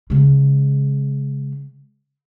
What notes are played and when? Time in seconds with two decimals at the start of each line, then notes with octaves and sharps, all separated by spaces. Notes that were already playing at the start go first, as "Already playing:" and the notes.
0.10 C#3 G#3